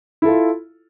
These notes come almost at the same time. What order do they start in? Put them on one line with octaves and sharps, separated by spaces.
E4 A4 F4